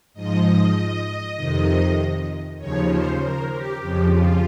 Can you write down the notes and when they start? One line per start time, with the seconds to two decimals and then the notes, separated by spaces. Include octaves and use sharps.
0.14 G#2 F3 D#5
1.36 F2 C3 D#3
2.58 D#2 C#3 F3 C#5
2.88 C5
3.19 A#4
3.50 G4
3.80 F2 C#3 F3 G4
4.11 F4